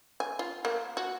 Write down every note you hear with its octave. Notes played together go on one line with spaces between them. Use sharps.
G#5
F4
A#3
F#4